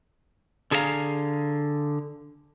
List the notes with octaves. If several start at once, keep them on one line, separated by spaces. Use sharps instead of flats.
D3 G#4 A4 C5 F5 A#5